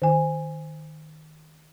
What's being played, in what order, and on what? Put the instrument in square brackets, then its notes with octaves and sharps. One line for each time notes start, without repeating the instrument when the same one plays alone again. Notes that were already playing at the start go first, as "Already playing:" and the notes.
[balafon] D#3 G#5